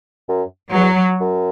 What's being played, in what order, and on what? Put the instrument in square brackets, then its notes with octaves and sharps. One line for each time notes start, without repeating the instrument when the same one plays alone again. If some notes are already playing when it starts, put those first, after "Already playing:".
[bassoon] F#2
[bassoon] E2 [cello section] F#3
[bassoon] F#2